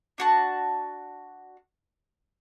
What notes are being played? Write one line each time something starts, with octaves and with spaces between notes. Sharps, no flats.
D4 F#4 A5